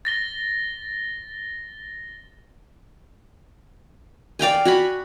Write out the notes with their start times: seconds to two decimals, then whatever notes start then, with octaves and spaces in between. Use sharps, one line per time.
0.05 A6 A#6 G7
4.39 D5 F5 G5 G#5
4.65 F#4 G#5 B5